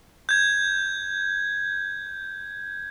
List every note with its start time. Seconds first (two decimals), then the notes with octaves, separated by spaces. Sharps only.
0.29 G6 G#6